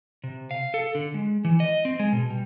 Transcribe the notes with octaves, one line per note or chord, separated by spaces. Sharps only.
C3
F5
A4
D3
G#3
E3
D#5
C4
G#3
B2
G3